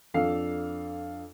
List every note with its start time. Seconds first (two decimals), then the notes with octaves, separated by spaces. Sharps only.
0.14 F2 D4 A4 F5 C7